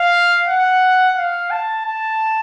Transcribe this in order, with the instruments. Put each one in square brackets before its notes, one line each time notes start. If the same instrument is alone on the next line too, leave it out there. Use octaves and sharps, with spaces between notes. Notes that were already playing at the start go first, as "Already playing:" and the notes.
Already playing: [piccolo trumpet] F5
F#5
F5
A5
A5